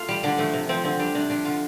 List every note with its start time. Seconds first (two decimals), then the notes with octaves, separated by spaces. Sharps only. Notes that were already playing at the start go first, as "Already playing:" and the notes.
Already playing: A3 F4
0.08 G3
0.23 D3 D4
0.38 F3 A3
0.54 C3
0.69 F3 C4
0.84 D3 C4
0.99 G3 D4
1.15 C3 D4
1.30 F3 D4
1.45 D3 F4